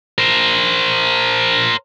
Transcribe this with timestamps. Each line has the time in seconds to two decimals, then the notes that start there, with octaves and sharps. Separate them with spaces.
0.18 A#4 C5